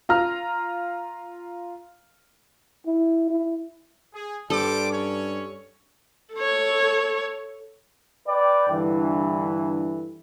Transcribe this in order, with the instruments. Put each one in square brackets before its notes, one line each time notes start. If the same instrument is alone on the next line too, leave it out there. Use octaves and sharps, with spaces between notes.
[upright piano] F4 A#5 F6
[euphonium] E4
E4
[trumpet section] G#4
[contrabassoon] G2 [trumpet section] G3 C5 D6 [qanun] A4
[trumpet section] C#4 C#5
[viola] A4 C#5
[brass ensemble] B4 D5 G5
G2 D3 E3